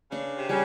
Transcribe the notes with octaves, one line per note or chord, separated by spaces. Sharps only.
C#3 D4
C3
C#3 G3